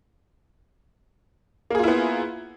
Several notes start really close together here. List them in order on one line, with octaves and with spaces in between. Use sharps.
A#3 G#4 F4 E4 B3